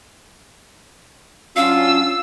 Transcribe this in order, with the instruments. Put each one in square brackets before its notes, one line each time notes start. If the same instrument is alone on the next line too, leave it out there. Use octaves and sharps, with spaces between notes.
[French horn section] F#3 D4 F4 [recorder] C#4 [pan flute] F5 [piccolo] E6